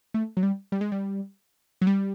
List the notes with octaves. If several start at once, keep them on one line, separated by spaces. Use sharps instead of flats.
A3
F#3
G3
G3
G#3
G3
F#3
G3